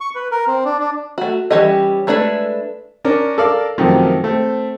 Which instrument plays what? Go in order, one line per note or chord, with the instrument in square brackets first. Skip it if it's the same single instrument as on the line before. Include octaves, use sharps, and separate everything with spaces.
[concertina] C#6
B4
A#4
C4
D4
D4
[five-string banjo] A3 F#4
E3 G3 C#4 G4 D#5
G#3 A3 D4 E4 B4
[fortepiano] C#4 D4 A#4
A4 A#4 D5 F5
F#2 C3 D#3 F3 A3
A3 C4